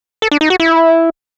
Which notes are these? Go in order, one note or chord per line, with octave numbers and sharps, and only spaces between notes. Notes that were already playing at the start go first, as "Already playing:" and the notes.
A4
D4
D#4
F#4
E4